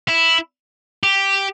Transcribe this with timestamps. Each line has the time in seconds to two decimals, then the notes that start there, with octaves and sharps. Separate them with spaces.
0.08 E4
1.03 G4